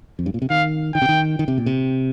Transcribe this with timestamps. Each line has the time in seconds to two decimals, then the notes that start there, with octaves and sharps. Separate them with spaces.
0.19 F2
0.26 G2
0.34 A#2
0.42 C3
0.50 D#3 F5
0.94 D#3 G5
1.02 C3
1.09 D#3
1.39 D#3
1.48 C3
1.58 A#2
1.66 C3